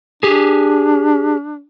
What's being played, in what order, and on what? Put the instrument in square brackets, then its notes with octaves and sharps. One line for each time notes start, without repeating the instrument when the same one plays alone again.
[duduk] D4 [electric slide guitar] G4 G#4